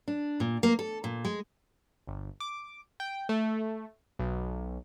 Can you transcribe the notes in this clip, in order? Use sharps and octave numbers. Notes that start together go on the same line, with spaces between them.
D4
A#2
A#3
A4
A#2
G#3
G1
D6
G5
A3
B1